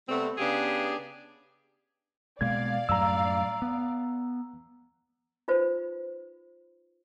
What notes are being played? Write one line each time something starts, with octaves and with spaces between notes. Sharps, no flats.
C3 G3 A3 B3 C4
C#3 B3 D4 G4 G#4
B2 G#3 A#3 D5 F5 G#6
F#2 A2 G3 A#5 E6
B3
D#4 F4 B4 C5